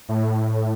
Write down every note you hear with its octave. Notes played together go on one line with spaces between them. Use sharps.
A2